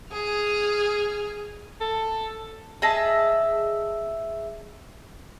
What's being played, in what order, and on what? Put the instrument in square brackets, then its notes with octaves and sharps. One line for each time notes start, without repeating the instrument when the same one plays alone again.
[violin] G#4 F6
[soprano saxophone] A4
[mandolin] G#4 D#5 E5 A5